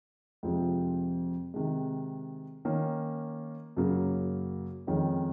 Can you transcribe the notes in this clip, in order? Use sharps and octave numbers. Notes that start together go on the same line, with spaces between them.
F2 C3 F3 G#3 C4
C3 D#3 G#3
D#3 A#3 C#4
F#2 C#3 F#3 A#3
F2 D#3 G#3 C#4